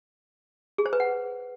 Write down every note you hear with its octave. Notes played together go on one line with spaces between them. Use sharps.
G#4
C5
B4
F#5